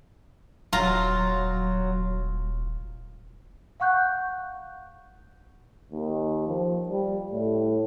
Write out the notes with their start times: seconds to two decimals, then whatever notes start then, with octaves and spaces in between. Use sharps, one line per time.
0.73 D#1 F#3 F4 A#5
3.80 F5 F#5 C#6 F#6 G6
5.92 D#2
6.48 F3
6.89 G3
7.32 A2